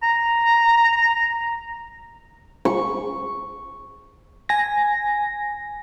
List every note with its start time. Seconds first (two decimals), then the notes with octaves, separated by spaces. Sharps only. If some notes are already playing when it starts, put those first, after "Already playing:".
0.03 A#5
2.65 C#6
4.49 G#5 A#6